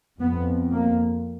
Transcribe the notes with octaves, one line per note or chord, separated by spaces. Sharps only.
F2 B3
A#3